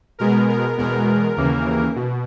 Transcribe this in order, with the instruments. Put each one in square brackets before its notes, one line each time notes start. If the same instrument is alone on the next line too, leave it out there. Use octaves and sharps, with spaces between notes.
[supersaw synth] B2 G#3 B3 A#4
A#4
E2 B2 G#3 B3 A#4
D#2 C#3 E3 A#3
B2